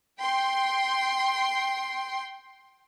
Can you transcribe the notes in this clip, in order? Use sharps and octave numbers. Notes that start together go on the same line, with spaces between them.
G5 C6